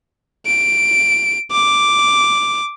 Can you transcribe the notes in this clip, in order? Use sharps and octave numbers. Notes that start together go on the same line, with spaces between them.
D7
D6